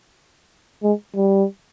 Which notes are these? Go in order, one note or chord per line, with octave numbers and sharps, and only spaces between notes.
G#3
G3